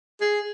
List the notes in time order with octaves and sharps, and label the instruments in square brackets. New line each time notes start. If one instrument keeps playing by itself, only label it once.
[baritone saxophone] G#4